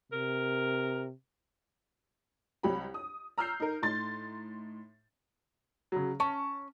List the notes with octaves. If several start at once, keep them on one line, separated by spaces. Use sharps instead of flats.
C3 A#4
C2 F#3 G4 B5
D#6
A#5 E6 F6 G6 C7
D#4 A#4
A2 D#4 C6 A6
C#3 F#3
C#4 A5